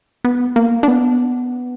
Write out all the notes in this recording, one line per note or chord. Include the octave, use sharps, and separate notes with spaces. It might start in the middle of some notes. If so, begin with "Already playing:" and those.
B3
A#3
D4
B3